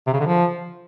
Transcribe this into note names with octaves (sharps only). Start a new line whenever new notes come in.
C3
C#3
D3
F3